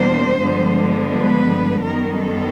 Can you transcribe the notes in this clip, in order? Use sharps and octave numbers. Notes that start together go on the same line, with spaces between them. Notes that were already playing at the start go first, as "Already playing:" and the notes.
Already playing: E2 B2 G3 A#3 D4 C5
G2 D3 F3 G#3 B3
B4
F#2 D#3 G3 B3 A#4
A4